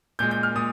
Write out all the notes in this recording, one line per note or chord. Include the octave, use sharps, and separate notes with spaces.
A#2 G#3 G6
G6
F6
A#2 G#3 D#6